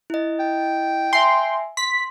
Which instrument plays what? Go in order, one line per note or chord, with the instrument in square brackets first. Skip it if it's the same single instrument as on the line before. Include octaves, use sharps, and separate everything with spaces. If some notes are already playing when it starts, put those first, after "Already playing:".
[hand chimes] E4 D#5
[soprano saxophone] G5
[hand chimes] E5 G#5 [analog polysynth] C6
[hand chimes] C6 [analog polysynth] B6